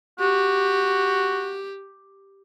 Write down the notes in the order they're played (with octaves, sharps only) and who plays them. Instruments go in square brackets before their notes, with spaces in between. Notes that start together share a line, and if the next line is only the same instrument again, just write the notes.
[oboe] F#4 [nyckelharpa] G4